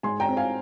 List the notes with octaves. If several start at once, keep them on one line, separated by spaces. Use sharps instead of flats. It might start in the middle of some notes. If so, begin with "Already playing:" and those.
G#2 G#5 C6
G5 A#5
C4
F5 G#5